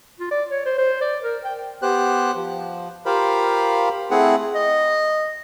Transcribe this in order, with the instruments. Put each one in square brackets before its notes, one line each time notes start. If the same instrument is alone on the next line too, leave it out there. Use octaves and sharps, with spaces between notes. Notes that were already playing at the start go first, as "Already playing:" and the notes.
[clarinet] F4
D5
C#5
C5
C5
D5
A#4
G5
[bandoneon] B3 G4 C5 F#6
F3
F4 G4 A#4 C5 F5 B5
A3 C4 E4 G#4 F#5
[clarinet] D#5